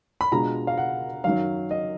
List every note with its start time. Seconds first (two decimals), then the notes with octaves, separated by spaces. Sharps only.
0.21 B5
0.32 B2 G#3 D4 F4 A#5
0.67 F5
0.78 F#5
1.24 F#2 D#3 F#3 F5
1.71 D#5